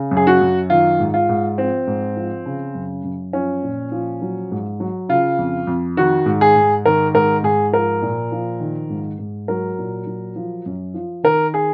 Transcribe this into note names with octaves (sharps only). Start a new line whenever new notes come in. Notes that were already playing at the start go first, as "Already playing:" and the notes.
Already playing: C#3
F#2
G#4
F#4
F#2
D#3 F4
G#2
F4
G#2
F3 C4
G#2
F3
C#3
F#2
F#2
F3 C#4
A#2
F3
F#3
G#2
F#3
C#3 F4
F2
F2
D#3 F#4
G#2
G#4
G#2
D#3 A#4
G#2 A#4
G#2 G#4
F3 A#4
A#2
F3
D#3
G#2
G#2
F#3 A#4
A#2
F#3
F3
F#2
F3
D#3 A#4
G#4